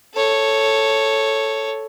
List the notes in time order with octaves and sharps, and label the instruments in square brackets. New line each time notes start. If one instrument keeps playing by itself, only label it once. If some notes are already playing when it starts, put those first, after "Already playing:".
[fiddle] A4 C#5